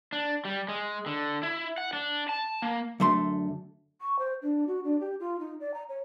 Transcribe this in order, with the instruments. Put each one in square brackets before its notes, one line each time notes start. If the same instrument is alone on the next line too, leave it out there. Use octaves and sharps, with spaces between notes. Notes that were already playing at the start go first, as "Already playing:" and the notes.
[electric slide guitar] D4
G3
G#3
D3
E4
F#5
D4
A5
A#3
[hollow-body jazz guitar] F#2 D3 A3 A4 C6
[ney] C#6
C5
D4
F#4
D4
G4
F4
D#4
D5
A#5
C#5